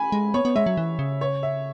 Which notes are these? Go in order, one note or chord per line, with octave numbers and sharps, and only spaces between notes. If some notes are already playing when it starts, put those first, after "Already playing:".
Already playing: G#5 B5
G#3
B3 C#5
B3
G#3 E5
F#3
E3
C#3
C#5
E5